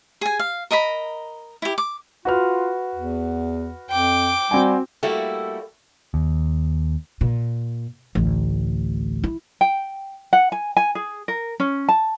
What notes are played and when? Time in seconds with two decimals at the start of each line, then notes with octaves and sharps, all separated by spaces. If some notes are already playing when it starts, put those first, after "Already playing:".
0.21 G#4 G#5
0.39 F5
0.71 A#4 D#5 A#5 B5
1.62 E4 G4
1.78 D6
2.25 F4 F#4 B4 F6
2.95 E2
3.90 F2 G5 D6
4.51 G3 C4 F#4 G#5
5.03 G3 A3 A#3 E4 F#4 A4
6.14 D#2
7.21 A#2
8.15 A1 D2
9.23 E4
9.61 G5
10.33 F#5
10.52 G#5
10.77 G#5
10.95 G#4
11.28 A#4
11.60 C#4
11.89 A5